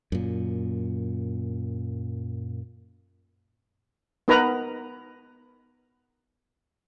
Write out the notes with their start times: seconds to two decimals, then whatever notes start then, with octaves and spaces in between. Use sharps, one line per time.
0.12 F#2 A#2
4.28 B3 D#4 A#4 B4 A#5